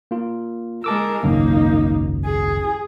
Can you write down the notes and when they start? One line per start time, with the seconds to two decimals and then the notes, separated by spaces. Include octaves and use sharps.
0.11 A#3 F4
0.84 G#3 A#4 A5 D6 E6
1.23 G#1 C#2 F#2 A#3 D#4
2.25 G#4